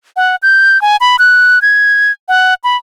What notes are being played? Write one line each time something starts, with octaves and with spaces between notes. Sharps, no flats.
F#5
G6
G#5
B5
F#6
G#6
F#5
B5